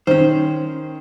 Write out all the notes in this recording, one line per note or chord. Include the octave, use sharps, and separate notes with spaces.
D#3 C#4 C5